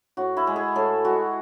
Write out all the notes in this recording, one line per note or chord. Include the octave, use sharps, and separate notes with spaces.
A2 F#4
E4
G#3
G#4
A2 A4
G#3 F#4